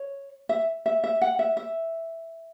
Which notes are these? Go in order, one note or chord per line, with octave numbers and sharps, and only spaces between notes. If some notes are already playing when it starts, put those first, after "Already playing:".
Already playing: C#5
E5
E5
E5
F#5
E5
E5